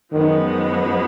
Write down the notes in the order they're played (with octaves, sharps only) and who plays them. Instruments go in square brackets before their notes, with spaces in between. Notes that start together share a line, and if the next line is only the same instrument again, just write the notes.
[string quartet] F#2 F3 G#3 B3 [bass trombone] D#3